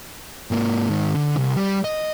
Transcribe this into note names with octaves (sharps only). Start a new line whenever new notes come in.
G#2 A#3
G#2 D#3
D3
C2
G3
D#5